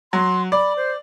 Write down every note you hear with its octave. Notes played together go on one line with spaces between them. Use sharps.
F#3 C6
D5 B5
C5